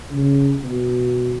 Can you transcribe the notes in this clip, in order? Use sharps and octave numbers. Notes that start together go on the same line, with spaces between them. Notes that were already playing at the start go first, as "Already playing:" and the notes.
C#3
B2